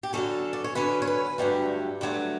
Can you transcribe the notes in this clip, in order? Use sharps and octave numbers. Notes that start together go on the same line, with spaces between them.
G4
D3 F#3 C#4 A4
D5
C#5
D3 F#3 C#4 B4
C#5
B4
G2 D3 F#3 A3 G4
G2 D3 F#3 A3